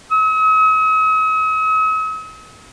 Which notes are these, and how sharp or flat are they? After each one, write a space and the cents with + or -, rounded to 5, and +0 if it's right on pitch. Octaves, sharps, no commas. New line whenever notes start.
D#6 +45